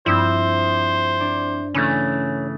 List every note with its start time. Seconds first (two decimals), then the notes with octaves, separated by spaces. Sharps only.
0.06 G2 F3 C4 E4 C5 E6
1.20 D4
1.74 C#3 E3 A3 C#4